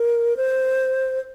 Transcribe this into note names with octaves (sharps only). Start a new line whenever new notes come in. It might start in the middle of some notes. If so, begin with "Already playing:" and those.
Already playing: A#4
C5